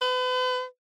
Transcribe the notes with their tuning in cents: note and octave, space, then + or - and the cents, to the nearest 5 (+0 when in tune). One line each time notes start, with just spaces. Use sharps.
B4 +40